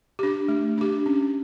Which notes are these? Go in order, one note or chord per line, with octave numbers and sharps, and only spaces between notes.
D4 G4
A3
D4 G4
C#4